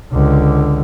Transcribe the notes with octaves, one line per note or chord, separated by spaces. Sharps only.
C#2 D3